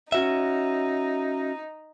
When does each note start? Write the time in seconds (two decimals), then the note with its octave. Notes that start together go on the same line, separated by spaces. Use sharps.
0.12 C#4 D#4 F#4 E5